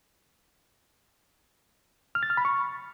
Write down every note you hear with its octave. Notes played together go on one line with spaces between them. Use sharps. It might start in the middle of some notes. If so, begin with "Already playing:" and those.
F6
A6
F6
B5
C#6